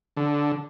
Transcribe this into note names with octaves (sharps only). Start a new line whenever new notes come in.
D3